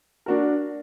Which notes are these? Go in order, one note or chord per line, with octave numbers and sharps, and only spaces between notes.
D4 F#4 A#4